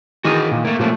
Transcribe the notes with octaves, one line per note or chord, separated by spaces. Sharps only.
D#3 E3 F#4 G#4
A#2
A3 A#3
A#2 F3 F#3 A3 A#3